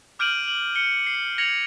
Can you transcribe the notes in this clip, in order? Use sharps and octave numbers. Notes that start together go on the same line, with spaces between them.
D6 F6 G6 D7 D#7 F#7
F#7
C#7 G7
C7
G#6 A#6 C#7 F7 F#7